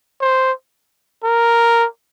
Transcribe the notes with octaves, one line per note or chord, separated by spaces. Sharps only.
C5
A#4